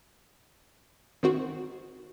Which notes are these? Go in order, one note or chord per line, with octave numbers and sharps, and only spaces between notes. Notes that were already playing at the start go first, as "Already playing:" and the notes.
D#3 C4 F#4